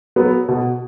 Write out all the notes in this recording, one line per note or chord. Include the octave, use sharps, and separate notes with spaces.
F#3 B3
B2